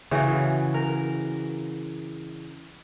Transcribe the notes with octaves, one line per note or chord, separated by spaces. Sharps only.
C#3 E3 F#4
A#4